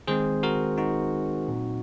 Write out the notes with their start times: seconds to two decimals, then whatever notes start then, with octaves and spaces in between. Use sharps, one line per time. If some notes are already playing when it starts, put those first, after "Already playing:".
0.07 D#3 G#3 C4 G#4 C5
0.43 F#4 A#4
0.78 D#4 F#4
1.48 A#2 F#3 C4